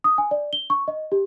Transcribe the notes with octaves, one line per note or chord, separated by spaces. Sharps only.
D#6
G#5
D5
G7
C#6
D#5
G4